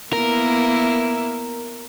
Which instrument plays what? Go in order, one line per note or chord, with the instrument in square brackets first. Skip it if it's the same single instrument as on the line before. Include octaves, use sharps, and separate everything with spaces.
[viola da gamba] A#3 B3 E4 [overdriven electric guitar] A#4